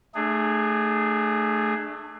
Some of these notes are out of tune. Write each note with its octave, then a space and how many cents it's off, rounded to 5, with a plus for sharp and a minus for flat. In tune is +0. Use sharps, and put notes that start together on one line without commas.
A3 +0 D4 +35 G#4 +0